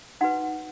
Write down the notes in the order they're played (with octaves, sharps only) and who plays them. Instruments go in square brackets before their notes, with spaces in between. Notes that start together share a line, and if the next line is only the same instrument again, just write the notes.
[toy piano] D#4 F#4 B4 F#5